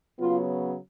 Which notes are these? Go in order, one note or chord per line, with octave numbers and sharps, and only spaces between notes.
C#3 F#3 B3 F4